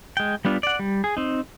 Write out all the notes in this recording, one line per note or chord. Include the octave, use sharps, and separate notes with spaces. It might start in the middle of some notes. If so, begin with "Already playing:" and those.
G#3 G5
G3 B3 D4 F4
D5 F#5
G3
G#4
C4 D#4